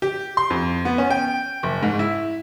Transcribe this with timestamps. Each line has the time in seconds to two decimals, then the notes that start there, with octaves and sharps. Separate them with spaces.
0.02 G4
0.37 C6
0.50 F2
0.85 B3
0.98 C#4
1.10 G5
1.63 F#1
1.83 G#2
1.99 E4